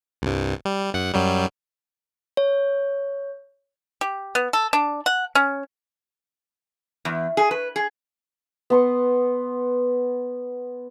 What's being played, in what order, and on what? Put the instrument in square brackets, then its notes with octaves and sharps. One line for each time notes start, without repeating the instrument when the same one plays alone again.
[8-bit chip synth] C2 G2
G3
F#2 F#5
F#2 F#3 G3
[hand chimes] C#5
[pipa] G4
B3
A4
D4
F#5
C#4
[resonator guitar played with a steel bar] E2
G#4
B4
G#4
[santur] B3 C6 C#6